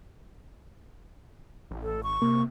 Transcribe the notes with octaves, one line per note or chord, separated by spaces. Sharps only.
A1
A4
G#1 C#6
C3 A#3